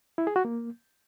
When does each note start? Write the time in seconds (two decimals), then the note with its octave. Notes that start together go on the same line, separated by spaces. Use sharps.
0.18 E4
0.27 G#4
0.36 F#4
0.45 A#3